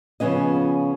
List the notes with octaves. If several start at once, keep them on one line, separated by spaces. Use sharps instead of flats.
C#3 F3 B3 C#4 D#5